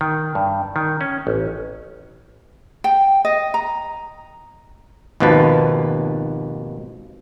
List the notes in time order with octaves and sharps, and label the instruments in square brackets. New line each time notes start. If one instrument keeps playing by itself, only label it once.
[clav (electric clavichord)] D#3
G2
D#3
C#4
A1
[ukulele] G5
D#5
A#5
[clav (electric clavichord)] G#1 D#2 B2 F3 B4 A5